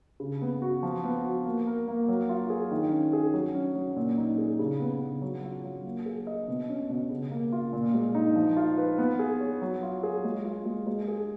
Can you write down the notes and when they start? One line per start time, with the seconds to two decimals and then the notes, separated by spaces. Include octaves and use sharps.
0.20 C#3
0.42 B3
0.62 F#4
0.83 F3
1.04 B3
1.25 F#4
1.45 A#3
1.67 A#4
1.88 A#3
2.08 F#3
2.29 F4
2.50 G#4
2.71 D#3
2.92 C#4
3.13 G#4
3.34 F#3
3.54 C#4
3.75 F#3
3.96 A#2
4.18 D#4
4.38 G#4
4.59 C#3
4.80 B3
5.01 C#3
5.22 F#3
5.44 F4
5.64 F#3
5.85 A#3
6.06 G#4
6.27 D#5
6.48 B2
6.69 C#4
6.89 B2
7.10 C#3
7.31 A#3
7.52 F4
7.73 A#2
7.94 G#3
8.15 D#4
8.36 F3
8.57 F4
8.78 B4
8.98 B3
9.19 G#4
9.40 C#5
9.62 F#3
9.83 F4
10.03 G#4
10.24 G#3
10.45 F4
10.66 G#3
10.87 G#3
11.08 G#4